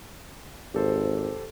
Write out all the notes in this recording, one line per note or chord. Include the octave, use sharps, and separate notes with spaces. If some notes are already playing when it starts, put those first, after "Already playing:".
G#1 G4 A4 C5